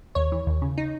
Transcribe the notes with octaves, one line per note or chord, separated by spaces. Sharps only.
D#2 C#5
E3
D#2
C#3
D#4